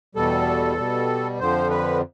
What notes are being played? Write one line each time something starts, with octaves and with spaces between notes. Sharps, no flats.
E2 B2 G3 A4
B2 G3
F2 D3 F3 C5
B4